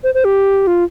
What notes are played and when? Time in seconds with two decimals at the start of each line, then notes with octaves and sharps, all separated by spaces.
0.04 C5
0.14 C5
0.25 G4
0.67 F4